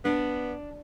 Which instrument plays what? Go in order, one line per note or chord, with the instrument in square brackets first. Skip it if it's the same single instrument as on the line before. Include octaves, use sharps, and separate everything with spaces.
[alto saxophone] B3 [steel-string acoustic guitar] D4